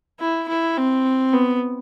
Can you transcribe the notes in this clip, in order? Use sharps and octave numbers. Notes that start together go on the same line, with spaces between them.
E4
E4
C4
B3